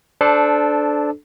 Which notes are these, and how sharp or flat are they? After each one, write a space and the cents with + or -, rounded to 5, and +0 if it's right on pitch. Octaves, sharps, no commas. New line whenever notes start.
D4 +0 A4 -15 C5 -20